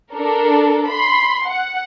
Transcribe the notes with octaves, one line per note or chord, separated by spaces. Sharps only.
D4 A4 A#4
B5 C6
F#5